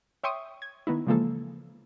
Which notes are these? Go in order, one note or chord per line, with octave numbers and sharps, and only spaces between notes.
C#5 E5 G5 C6 C#6 D#6
G#6
D#3 B3 D#4 E4
C#3 E3 F3 G#3 A#3 A4